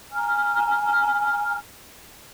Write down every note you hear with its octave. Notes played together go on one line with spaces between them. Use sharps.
G#5 A#5 F6